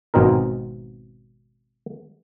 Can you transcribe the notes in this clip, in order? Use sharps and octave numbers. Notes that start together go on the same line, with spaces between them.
G#1 B2 C4 D#4 A#4